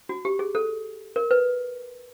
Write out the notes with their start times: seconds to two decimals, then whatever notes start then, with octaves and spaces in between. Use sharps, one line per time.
0.09 F#4
0.25 G4
0.39 G#4
0.55 A4
1.16 A#4
1.31 B4